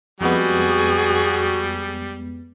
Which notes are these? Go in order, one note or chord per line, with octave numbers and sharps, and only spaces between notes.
F2 G3 G#3 B3 F#4 G#4